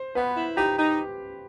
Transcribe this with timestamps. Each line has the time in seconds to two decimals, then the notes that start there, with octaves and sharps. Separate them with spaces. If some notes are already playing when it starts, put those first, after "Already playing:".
Already playing: C5
0.15 B3 B4
0.36 E4
0.56 D#4 G4
0.78 D#4